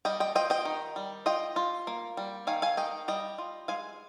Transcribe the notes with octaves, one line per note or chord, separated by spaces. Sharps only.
G3 D#5 G5
D#5 G5
F4 D#5 G5
D#5 G5
D#3
G3
F4 D#5 G5
F4
A#3
G3
D#3 F5 G#5
F5 G#5
D#3 D#5 G5
G3 D#5 G5
F4
G#3 F5 G#5